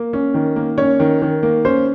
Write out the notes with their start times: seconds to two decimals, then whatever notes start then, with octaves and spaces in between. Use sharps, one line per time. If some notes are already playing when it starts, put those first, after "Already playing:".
Already playing: A#3
0.13 C#4
0.34 D#3
0.56 A#3
0.78 C#4 C#5
1.00 D#3
1.22 D#3
1.43 A#3
1.65 C#4 C5